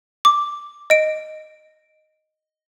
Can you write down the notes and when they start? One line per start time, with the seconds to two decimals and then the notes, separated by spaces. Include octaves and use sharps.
0.25 D6
0.90 D#5 D7